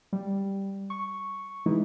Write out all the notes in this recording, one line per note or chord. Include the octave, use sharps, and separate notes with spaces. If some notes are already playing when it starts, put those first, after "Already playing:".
G3
C#6
E3 G#3 D#4 E4